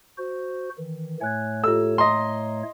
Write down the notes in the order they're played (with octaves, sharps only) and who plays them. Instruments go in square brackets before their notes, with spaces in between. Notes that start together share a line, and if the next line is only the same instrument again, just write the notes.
[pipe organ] F#4 C5
D#3 E3
[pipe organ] A2 A3 C#5 [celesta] G#5 F#6 G#6
[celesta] F4 G4 A4 [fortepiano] E6
[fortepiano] D#5 C6 [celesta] A#5